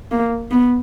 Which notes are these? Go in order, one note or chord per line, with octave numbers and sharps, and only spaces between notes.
A#3
B3